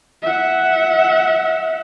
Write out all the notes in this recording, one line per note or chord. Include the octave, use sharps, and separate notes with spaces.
E5 F#5